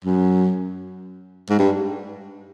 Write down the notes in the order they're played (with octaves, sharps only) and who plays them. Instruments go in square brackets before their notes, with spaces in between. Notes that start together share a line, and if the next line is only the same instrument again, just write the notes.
[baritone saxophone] F#2
G#2
G2